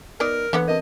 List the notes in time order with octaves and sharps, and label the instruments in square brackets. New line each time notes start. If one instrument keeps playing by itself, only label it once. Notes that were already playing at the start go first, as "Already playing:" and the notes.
[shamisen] B3 D#4 D5 [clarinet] A#4
[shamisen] D3 B3 F#5 [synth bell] E3 B4
[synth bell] C4 A#4 [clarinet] D#5